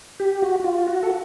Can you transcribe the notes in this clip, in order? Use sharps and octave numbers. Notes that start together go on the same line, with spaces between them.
G4
F#4
F#4
F4
F#4
A4